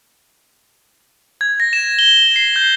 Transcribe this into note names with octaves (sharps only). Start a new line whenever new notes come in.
G#6
A#6
E7
G7
G7
C7
G6